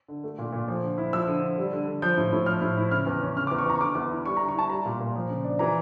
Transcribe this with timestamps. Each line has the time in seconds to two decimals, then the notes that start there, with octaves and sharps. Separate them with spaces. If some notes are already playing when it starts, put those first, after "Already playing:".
0.08 D3
0.24 A3
0.38 A#2
0.53 A#2
0.68 F3
0.83 D3
0.98 E4
1.13 F3 E6
1.27 D3
1.42 D3
1.58 G3
1.73 D3
1.87 D3
2.02 F3 G6
2.17 A2
2.33 A2
2.46 F3 F6
2.61 A2
2.77 E4
2.91 C#3 F6
3.06 E2
3.21 C#4
3.37 C#3 F6
3.47 E2 D6
3.58 C#6
3.66 E2 A#5
3.76 C#6
3.81 D3 D6
3.95 E2
4.11 E4
4.26 G3 C#6
4.37 D3 A#5
4.48 C#6
4.55 E4 A5
4.70 G3 A#5
4.85 A#2
5.01 A#2
5.15 F3
5.30 C#3
5.44 D4
5.59 E3 A#5